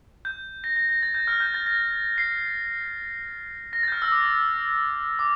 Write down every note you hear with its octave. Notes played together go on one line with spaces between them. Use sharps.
G6
A#6
A#6
A#6
A6
G6
F6
G6
A6
A#6
C7
A#6
A6
G6
F6
E6
D6
D6